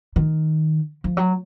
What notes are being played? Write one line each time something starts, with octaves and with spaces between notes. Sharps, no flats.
D#3
F3
F#3